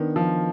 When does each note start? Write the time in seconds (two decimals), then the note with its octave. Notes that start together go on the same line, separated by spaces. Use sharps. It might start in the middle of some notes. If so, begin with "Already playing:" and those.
Already playing: D#3 B3 D4
0.16 F3